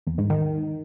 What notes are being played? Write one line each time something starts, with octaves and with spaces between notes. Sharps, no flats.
E2
G#2
D#3